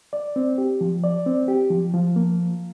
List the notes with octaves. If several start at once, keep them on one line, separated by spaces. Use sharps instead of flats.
D5
C4
G4
F3
D5
C4
G4
F3
F3
A#3